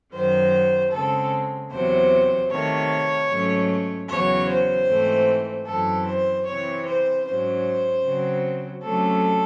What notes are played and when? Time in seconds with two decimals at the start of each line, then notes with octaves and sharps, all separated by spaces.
0.13 F#2 D#3 F#3 C5
0.92 C#3 G#3 C4 A4
1.71 E2 C3 F#3 C4 C5
2.50 C3 D#3 A3 C#5
3.29 G#2 F#3 A3 C#4
4.08 E2 C#3 F#3 C#5
4.48 C5
4.88 G#2 E3 A3 C4
5.66 F#2 E3 C4 A4
6.06 C5
6.46 C3 E3 C4 C#5
6.85 C5
7.25 G#2 F#3 C#4 C5
8.04 C#3 F#3 C4
8.83 C3 F#3 A3 C#4 A4